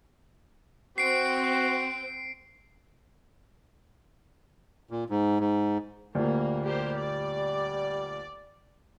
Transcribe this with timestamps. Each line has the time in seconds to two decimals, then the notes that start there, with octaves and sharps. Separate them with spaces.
0.98 C4 F#4 C7 D7
4.91 A#2
5.10 G#2
5.40 G#2
6.15 D2 A#2 G3 A#3
6.65 A#3 G4 C5
6.97 D5